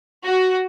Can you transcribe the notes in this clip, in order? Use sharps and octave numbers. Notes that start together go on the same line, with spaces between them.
F#4